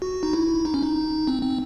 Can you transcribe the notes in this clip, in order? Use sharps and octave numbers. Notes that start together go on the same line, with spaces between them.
F#4
D#4
E4
D#4
C#4
D#4
C4
C4